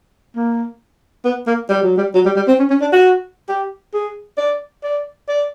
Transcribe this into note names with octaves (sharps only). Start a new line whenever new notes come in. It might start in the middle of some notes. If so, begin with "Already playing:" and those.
A#3
B3
A#3
G3
F#3
G3
F#3
G3
G3
C4
C#4
C#4
D4
F#4
G4
G#4
D5
D5
D5